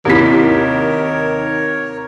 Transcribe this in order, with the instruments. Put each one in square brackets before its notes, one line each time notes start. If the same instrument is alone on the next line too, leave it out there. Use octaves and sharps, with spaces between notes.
[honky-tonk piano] D#2 C3 B6 [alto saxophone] D#3 [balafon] E4 G4 [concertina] A#4 C#5